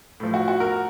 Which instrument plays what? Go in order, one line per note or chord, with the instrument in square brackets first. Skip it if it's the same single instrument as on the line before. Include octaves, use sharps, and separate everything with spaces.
[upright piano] A2 F3
F#4
F#4
A#4